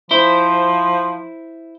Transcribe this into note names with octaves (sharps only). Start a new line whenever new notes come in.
F3 E4 C5